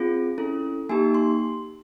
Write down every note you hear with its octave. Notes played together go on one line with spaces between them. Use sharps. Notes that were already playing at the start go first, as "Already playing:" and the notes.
Already playing: C4 F4 G#4
C#4 E4 A4
A#3 D#4 G4 G#5
C6